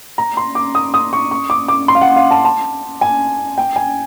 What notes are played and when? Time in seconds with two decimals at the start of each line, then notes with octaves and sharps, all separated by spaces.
0.18 A#5
0.37 C6
0.55 D6
0.75 D#6
0.94 D#6
1.13 C#6
1.31 C#6
1.50 D6
1.68 D6
1.88 C6
1.95 F5
2.01 F#5
2.16 F5
2.31 A5
2.45 A5
3.01 G#5
3.58 G5
3.76 G#5